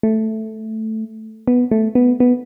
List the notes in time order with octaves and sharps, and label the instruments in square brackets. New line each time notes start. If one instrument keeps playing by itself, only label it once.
[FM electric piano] A3
B3
A3
B3
B3